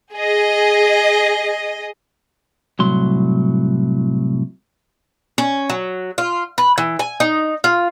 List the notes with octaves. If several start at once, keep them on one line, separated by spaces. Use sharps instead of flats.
G#4 D#5
C2 A2 F#3 C6
C#4
F#3
F4
B4
E3
G#5
D#4
F4